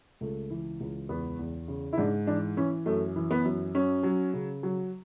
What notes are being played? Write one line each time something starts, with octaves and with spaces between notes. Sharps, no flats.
C#2 A3
E3
C#2
E2 B3
E2
C#3
E4
G#2 D4
E3 D4
E3 C#4
F#2 A3
E3
B3
F#2
F#3 C#4
F#3
C#3
F#3